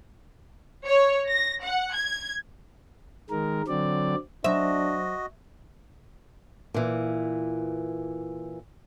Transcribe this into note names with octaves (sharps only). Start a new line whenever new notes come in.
C#5
A#6
F#5
G#6
D#3 G#3 A#4
D3 F#3 C4 D5
F#3 D4 F#4 C5 D#5 E5
A#2 E3